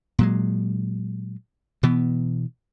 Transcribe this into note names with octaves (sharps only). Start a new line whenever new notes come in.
A#2 F#3 G#3
B2 E3 B3